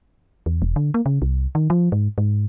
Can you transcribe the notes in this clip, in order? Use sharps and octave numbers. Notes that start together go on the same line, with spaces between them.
E2
E1
D3
A#3
C#3
C2
D#3
F3
G#2
G#2